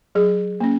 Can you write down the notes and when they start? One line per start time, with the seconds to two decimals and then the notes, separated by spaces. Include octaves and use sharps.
0.15 F#3 G#4
0.60 A#3 C#4